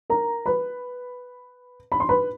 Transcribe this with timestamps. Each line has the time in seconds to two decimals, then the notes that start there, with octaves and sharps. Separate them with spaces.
0.10 A#4 A#5
0.46 B4 B5
1.92 B5
2.00 C6
2.09 B4 B5